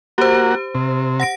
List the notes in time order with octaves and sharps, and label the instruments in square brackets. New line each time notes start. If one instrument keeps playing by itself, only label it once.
[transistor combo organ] A#3 F#4 [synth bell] G4 C5
[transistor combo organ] C3
[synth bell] F#5 A#6 D7